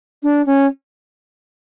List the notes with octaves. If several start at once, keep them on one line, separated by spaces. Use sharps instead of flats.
D4
C#4